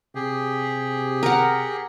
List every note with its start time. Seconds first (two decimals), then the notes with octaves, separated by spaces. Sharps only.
0.15 C3 G4 G#4
1.23 A#4 F#5